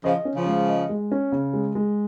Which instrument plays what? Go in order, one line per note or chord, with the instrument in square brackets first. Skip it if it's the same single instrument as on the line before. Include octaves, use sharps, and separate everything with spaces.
[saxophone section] C#3 F3 [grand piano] D#5
[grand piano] C#4
[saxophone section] C#3 F3
[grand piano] G#3
D#5
G#3
C#4
C#3
G#3
G#3